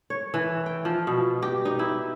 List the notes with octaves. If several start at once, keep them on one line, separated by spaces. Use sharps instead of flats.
C#5
E3
G5
F3
B2
G4
D#4
E4